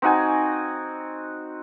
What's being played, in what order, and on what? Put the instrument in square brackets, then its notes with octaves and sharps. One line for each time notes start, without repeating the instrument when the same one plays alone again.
[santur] C4 D#4 F#4 G#5